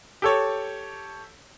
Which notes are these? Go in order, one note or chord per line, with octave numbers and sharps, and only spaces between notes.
G4 A4 C#5